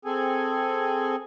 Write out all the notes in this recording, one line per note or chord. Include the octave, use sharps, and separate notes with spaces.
C4 G#4 A4 G#5